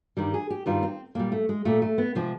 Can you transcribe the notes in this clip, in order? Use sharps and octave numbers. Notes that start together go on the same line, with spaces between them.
G2 D#3 G3
G#4
G4
G2 D#3 G3 F4
C4
A#2 G3 A#3
A3
G#3
A#2 G3 A3
A3
B3
C3 F3 G#3 C4